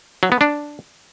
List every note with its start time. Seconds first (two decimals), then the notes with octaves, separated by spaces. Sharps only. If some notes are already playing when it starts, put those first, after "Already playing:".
0.23 F#3
0.32 B3
0.41 D4